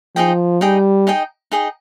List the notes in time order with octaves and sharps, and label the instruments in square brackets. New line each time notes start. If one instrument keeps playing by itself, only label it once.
[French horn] F3 [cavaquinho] D#4 G#4 D#5 G5
[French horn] G3 [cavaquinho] D#4 G#4 D#5 G5
[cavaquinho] D#4 G#4 D#5 G5
D#4 G#4 D#5 G5